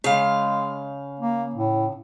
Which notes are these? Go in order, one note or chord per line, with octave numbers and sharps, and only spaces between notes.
C#3 G#3 F5
A#3
A2